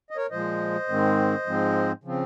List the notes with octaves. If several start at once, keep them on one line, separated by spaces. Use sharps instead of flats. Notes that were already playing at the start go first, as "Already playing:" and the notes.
D#5
A#4 C#5
A#2 F3 G#3 C5 D#5
G#2 D#3 G#3 C4
G#2 F3 G#3 C4
C#3 F3 C4